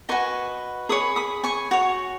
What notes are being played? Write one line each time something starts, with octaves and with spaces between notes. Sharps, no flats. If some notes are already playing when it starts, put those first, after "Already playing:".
F#4 B4 D#5 G#5 C#6
G#4 C#5 B5 D#6
B5 D#6
G#5 C#6
F#4 C#5